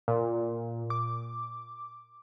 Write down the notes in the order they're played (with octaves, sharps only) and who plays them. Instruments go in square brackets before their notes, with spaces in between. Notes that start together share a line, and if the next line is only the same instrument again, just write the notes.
[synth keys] A#2
D6